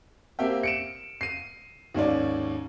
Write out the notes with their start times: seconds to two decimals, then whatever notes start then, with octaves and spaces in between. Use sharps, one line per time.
0.39 A#3 C4 G4 E5 G5
0.63 C#7 D7 E7
1.21 C7 D#7
1.95 D#2 G#2 C#4 D5